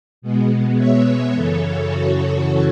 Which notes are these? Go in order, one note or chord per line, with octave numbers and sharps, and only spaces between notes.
B2 G#3 B3
C#5 E5
F#2 C#3 E3 A4 C#5
F#4